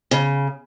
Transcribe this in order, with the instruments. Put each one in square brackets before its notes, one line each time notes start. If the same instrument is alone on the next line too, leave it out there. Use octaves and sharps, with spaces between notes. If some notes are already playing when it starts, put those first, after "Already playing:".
[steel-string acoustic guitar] C#3